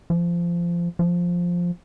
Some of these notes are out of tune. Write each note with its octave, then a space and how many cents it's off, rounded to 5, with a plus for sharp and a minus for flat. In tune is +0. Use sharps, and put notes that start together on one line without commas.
F3 -20
F3 +5